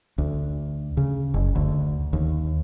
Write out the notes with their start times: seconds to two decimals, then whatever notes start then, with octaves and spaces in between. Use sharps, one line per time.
0.18 D2
0.97 C#3
1.34 F#1
1.56 D2
2.13 D#2